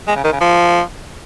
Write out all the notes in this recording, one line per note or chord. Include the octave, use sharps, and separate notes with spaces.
G#3
C#3
D#3
C#3
F3